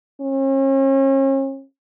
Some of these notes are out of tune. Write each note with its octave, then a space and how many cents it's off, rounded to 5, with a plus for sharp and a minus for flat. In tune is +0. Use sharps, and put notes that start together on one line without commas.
C#4 -40